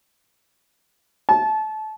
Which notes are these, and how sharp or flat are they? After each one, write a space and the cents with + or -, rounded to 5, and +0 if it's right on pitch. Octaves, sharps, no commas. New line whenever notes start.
A5 -25